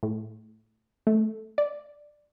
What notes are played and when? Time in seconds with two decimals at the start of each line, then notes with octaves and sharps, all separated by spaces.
0.03 A2
1.07 A3
1.58 D5